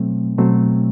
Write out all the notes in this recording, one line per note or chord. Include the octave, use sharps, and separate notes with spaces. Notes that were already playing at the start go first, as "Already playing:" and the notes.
Already playing: B2 F#3 A3 C4
B2 F#3 A3 C4